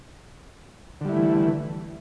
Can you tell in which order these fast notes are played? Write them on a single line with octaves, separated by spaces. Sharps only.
D3 G3 E4 A3 E3